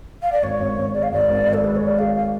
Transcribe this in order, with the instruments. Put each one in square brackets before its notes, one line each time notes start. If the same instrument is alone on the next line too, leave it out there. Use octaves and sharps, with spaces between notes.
[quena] F5
D5
[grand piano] G#1 [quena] C#5
[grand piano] G#1
G#1
[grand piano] G#3 [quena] D5
[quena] F5
[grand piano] G#1 [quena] D5
[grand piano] G#1
G#1
[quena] A4
[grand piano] G#3 [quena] B4
[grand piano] G#3 [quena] C#5
[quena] D5
[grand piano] G#3 [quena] F5
[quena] F5